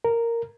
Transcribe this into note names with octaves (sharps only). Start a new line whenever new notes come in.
A#4